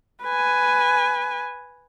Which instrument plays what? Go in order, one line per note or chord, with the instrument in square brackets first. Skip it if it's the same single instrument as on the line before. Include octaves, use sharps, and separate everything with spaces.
[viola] B4 G#5